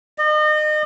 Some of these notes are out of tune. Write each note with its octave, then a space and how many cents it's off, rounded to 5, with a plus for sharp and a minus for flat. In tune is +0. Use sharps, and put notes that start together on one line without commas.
D#5 -35